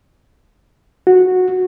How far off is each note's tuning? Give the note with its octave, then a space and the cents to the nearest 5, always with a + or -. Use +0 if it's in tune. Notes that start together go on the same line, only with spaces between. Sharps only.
F#4 -10